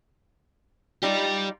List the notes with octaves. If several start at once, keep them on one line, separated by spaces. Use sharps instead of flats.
G3 D#4 F4 G4 D5